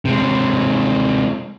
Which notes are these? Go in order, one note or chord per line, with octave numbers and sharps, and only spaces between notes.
C3 G#3